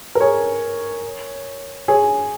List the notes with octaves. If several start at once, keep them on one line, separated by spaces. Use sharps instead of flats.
A#4
G#4 C#5
G#4 C#5